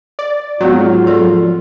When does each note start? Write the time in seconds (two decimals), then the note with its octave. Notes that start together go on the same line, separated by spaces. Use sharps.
0.19 D5
0.61 G#2 F#3 B3 C4 F4 F#4
1.06 F3 A4 D5